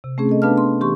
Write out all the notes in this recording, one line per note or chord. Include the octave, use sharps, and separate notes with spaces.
C3
A3 C4 C#4 G#4
A4 D#5
B3 D4 B4 F5 A5 F6
C6
E3 G4 C6 C#6